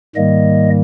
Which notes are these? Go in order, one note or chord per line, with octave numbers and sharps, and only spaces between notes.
G#2 D#3 G3 A#3 D#5